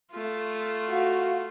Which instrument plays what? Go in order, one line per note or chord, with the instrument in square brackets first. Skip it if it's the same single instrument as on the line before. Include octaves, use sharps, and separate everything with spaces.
[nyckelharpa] A3 F4
[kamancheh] F#4 F5